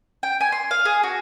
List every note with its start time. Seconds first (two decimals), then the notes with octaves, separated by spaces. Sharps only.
0.23 G5
0.41 G#5
0.52 C6
0.71 F5
0.85 G#4
1.03 F#4